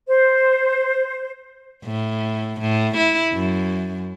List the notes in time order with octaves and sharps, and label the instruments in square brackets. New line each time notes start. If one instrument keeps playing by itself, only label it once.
[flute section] C5
[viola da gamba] A2
A2
E4
F#2